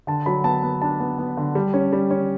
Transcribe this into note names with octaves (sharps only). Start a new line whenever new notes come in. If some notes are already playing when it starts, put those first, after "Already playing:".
D3 A5
F#3 B5
B3 A5
B3
D4 A5
B3
B3
D3
G3
C#4
G3
C#4